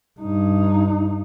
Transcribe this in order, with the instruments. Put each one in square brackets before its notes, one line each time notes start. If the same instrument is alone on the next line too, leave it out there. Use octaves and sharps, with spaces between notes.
[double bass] G2 D#4